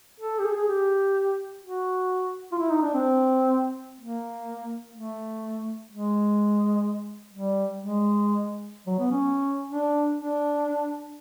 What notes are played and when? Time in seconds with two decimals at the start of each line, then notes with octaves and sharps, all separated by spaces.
0.20 A4
0.39 G4
0.45 G#4
0.56 G#4
0.69 G4
1.63 F#4
2.52 F4
2.59 E4
2.70 D#4
2.82 D4
2.94 C4
4.01 A#3
4.95 A3
5.91 G#3
7.33 G3
7.80 G#3
8.87 F#3
8.99 B3
9.11 C#4
9.70 D4
10.18 D4